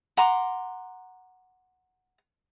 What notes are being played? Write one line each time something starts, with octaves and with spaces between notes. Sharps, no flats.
F#5 A#5 C6 D6